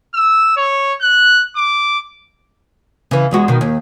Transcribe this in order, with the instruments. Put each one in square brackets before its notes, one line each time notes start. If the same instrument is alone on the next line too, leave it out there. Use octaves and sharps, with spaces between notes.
[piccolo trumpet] E6
C#5
F#6
D6
[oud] C#3 E3
E2 G#3 F#4
B2 D#3
D#2